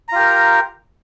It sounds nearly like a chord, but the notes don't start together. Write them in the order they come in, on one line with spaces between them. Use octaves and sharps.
A#5 F4 G4 A#4